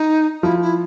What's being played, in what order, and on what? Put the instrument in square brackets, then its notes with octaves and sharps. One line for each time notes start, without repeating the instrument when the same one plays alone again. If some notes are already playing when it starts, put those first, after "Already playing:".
Already playing: [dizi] D#4
[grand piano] F3 [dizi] E4
[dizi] E4